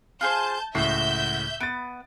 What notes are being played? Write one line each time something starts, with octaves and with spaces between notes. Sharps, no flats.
F4 G#4 C5 A5 G6
C#2 A2 F#4 E5 G6 C7
B3 A6 D7